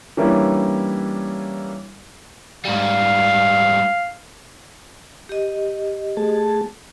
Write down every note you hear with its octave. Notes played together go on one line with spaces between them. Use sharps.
E3 G3 A#3 C#4 D4 E4
G#2 G3 F5
G4 D#5
A3 G#4 A5